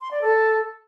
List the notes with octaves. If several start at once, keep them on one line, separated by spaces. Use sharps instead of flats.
C6
D5
A4